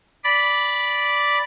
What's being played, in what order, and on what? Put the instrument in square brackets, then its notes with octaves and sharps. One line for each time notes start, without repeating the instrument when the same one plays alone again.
[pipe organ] D5 B5